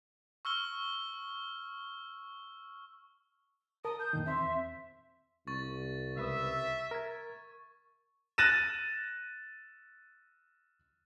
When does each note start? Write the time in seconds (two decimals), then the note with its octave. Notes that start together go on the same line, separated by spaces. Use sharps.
0.45 C#6 E6 F6 G7
3.85 A#4 A5 D#6
4.00 G6
4.13 F2 A#2 D#3
4.26 E2 C4 E5 C6
5.47 C2 C#6 A6
6.17 C#2 B4 E5 D#6
6.91 A#4 G#6
8.38 F#6 A6 A#6 D#7 E7